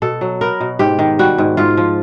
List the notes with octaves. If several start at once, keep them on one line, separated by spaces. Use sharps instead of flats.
B2 A4
F#3
B3 A#4
B2
G#2 G4
D#3
G3 F#4
G#2
G#2 F4
F3